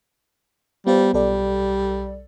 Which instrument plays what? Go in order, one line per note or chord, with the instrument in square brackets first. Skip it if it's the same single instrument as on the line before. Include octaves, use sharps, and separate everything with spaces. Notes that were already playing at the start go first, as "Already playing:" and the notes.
[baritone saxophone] G3 [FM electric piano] B3 F4 C5
[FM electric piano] B1 A4 D5 [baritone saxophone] G3